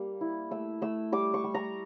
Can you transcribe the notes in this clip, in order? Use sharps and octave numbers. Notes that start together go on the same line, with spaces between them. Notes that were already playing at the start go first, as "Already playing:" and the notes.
Already playing: G3 A#3
E4
A3 E6
A3 E6
G3 D6
C#6
G3
A#5